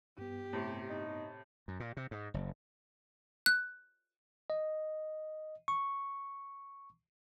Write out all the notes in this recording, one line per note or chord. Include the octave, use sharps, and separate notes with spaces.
G2 B3 G4
A2 C3
D#4
F#2
A#2
C3
G#2
F#1
F#6
D#5
C#6